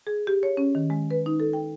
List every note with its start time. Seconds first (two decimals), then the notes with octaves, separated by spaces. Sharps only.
0.07 G#4
0.27 G4
0.43 C#5
0.57 C#4
0.75 D#3
0.90 G#3
1.11 B4
1.26 D#4
1.40 A4
1.53 G5